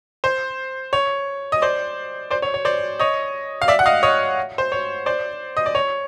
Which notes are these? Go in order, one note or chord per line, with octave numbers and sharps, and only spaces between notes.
C5
C#5
D#5
C5 D5
C5 D5
C#5
C#5
C5 D5
C#5 D#5
F5
D5 E5
F#5
D#5 F5
C#5 D#5
C5
C#5
C5 D5
D#5
D5
C#5